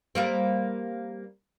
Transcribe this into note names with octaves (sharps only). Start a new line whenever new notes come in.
G3 A#3 C4